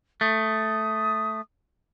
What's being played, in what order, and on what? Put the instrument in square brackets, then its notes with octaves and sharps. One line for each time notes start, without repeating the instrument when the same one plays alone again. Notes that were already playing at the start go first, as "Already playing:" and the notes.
[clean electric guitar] A3 [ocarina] D#6